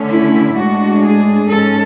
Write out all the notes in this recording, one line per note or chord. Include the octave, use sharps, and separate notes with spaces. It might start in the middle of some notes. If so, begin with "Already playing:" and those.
Already playing: D3 A3 C#4
E4
A2 G#3 D4 F#4
G#4
G#2 G#3 C#4 A4